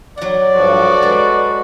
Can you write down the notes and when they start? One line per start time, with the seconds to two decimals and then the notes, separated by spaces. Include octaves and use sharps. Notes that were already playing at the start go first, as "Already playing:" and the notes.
0.17 F#3 D5 F#5
0.55 G2 F3 F#4 A4
1.03 G#3 B4